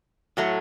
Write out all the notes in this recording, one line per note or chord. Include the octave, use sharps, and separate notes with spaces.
A2 F#3 A3